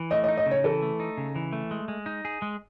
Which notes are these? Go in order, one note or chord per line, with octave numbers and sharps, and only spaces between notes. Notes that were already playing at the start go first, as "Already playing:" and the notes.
Already playing: E3
A3 D#5
D#5
D#4
D#5
C#3
C#5
E3 A4
A3
D#4
C#3
E3
A3
G#3
G#3
D#4
G#4
G#3